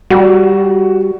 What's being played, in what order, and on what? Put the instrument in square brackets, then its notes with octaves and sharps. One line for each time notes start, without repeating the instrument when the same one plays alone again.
[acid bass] G3 [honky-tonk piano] F#4